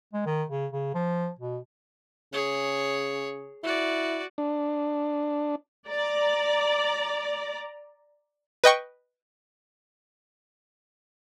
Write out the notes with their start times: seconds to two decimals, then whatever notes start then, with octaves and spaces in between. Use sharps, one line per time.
0.13 G#3
0.26 D#3
0.50 C#3
0.72 C#3
0.94 F3
1.39 B2
2.33 C#3 G#4 C#5
3.63 E4 F#4 D5
4.38 D4
5.88 D5 A#5
8.64 B4 D#5 G5 C#6